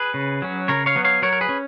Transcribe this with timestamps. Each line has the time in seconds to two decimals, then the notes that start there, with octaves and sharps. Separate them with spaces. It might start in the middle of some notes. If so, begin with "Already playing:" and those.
Already playing: G#4 B4
0.14 C#3
0.42 F#3 C#4
0.68 C#3 A#4 C#5
0.86 C#5 F5
0.96 F#3 B3
1.04 C#5 F5
1.22 F#3 A#4 C#5
1.33 A#4
1.41 G#4 B4
1.49 C#4